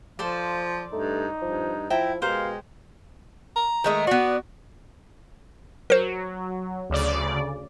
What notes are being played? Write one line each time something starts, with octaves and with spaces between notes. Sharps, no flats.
F3 A4 C5 D5 F5
G2 A3 D#4
G2 F3
F3 E4 E5 G5 A#5
B2 G#3 G4 A#4 C5 F5
A#5
D#3 G#3 A3
B3 F#4 D5
F#3 A#4 C5
D2 C#3 D5